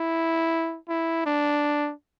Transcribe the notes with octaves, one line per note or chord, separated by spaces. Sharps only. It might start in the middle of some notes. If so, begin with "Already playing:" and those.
Already playing: E4
E4
D4